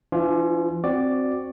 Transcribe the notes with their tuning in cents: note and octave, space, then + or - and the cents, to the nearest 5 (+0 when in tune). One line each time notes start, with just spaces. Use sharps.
E3 +45 D4 +0 F4 +15
C4 +0 F#4 +0 D5 +0